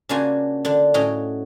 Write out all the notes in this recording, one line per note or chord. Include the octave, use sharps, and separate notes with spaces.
C#3 A#3 D4 F4 F#4 G#5
D3 D4
A2 C#4 F#4 D#5 G5